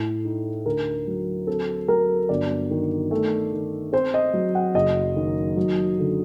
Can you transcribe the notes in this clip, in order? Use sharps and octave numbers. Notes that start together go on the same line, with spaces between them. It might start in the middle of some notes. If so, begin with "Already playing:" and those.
Already playing: A2
D#4
D2 A#4
F#3
C4 A4
F#3 A#4
G1 D5
D#3
A3
D#3
C4 C5
D#5
F#3
F#5
F#1 D#5
D#3
F#3
D3